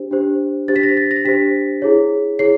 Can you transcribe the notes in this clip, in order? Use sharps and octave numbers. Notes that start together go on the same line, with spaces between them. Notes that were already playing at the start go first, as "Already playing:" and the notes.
Already playing: D4 G4 C5
D4 G4 C5
D4 G4 C5 A6
B6
A#6
A6
A#6
D4 G4 C5 B6
E4 G#4 C#5
E4 G#4 C#5 C7